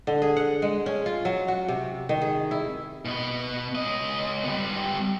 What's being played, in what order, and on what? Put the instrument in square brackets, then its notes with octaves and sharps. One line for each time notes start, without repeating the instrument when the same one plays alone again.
[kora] D3
G#4
F#5
G#3
C#4
F4
F#3
F#4
C3
D#3
G#4
E4
[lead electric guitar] B2 B3
C#2 D#5
G3 B3